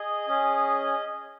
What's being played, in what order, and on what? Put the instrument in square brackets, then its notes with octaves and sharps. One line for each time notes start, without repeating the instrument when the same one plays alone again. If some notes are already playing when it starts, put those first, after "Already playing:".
Already playing: [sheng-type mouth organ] G#4 D#5
C#4 G#4